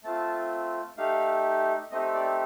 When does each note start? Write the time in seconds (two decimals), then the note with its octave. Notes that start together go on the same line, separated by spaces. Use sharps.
0.04 A3 C4 F4 A5
0.97 A3 D#4 G4 F5
1.91 A3 C4 D#4 G4 D#5
2.14 D5